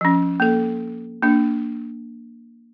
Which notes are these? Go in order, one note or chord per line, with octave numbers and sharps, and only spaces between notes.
F3 C#4
A#3 A4
A#3 D4